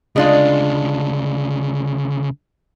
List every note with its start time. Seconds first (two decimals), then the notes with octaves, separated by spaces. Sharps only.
0.16 D2 C#3 G#3 D4 F4